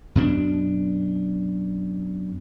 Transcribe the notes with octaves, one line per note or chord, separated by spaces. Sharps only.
F#2 B2 B3 D4